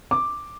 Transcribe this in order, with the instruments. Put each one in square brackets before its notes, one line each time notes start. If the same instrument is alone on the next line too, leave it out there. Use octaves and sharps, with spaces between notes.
[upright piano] D6